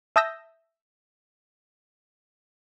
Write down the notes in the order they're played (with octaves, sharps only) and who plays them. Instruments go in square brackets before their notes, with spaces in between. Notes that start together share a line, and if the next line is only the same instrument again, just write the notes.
[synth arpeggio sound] E5 A5 D#6 E6 G6 A#6